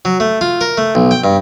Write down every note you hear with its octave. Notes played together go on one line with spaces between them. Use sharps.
F#3
A3
F4
A#4
A3
B1
G5
G2